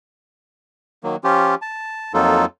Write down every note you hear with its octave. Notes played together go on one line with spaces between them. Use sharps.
D#3 F#3 A#3
F3 C#4 F4 G4
A5
F2 F#3 A#3 D#4 F4 A4